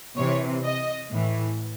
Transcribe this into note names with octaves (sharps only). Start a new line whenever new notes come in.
C3 E3 C#5
D#5
A2 E3